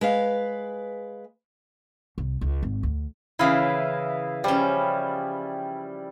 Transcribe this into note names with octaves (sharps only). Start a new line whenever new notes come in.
G#3 B4 F5
C2
C#2
G#1
D2
C#3 E3 E4 D#5 F5
F3 G3 C#4